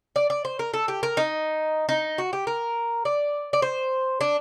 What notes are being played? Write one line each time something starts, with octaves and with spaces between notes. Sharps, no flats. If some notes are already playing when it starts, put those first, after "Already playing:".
D5
D5
C5
A#4
A4
G4
A#4
D#4
D#4
F#4
G4
A#4
D5
D5
C5
D4